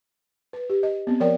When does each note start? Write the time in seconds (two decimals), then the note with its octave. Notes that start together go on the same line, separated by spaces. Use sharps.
0.53 B4
0.70 G4
0.83 D#5
1.07 B3 C4
1.20 F3 A#4 C#5 D5 G5